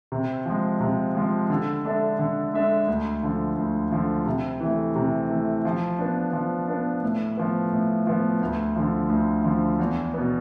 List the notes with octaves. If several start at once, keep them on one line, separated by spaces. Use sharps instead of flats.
C3
F3 G#3
C3
F3 G#3
D3
G#3 D4 A4 E5
D3
G#3 D4 A4 E5
D2
D3 F3
D2
D3 F3
C3
E3 A3
C3
E3 A3
F3
B3 D4
F3
B3 D4
A2
F3 B3
A2
F3 B3
D2
D3 F3
D2
D3 F3
E2
B2 B3